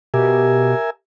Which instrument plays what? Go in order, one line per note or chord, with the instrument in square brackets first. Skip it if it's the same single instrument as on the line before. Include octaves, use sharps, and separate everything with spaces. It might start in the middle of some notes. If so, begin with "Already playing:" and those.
[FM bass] B2 [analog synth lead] G4 [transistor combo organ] A#4 E5 G#5